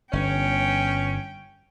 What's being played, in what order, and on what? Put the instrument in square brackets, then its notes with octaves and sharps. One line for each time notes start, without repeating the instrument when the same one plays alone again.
[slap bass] G1 [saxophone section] C#4 [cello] G5